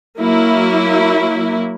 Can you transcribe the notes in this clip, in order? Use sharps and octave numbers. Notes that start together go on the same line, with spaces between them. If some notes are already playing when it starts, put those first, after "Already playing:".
F#3 A#3 E4